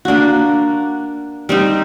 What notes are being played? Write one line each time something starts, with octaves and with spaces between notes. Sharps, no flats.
A#3 D4 F#4
G3 C4 D#4